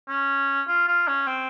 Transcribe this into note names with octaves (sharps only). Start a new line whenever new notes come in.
C#4
F4
F4
C#4
C4